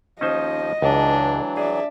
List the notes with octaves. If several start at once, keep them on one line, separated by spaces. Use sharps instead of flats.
D#2 F3 C#4 D#4 C5 D#5
C#2 E3 F#3 G#3 D4
G#4 D5 E5